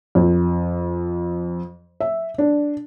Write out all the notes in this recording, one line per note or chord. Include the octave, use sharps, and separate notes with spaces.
F2
E5
D4